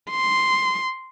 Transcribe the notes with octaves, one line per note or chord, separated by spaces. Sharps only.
C6